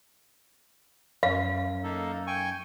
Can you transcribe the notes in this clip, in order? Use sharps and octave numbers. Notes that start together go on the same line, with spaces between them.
F#2 F5
A#3 D#4 A4
G5 G#5 C#6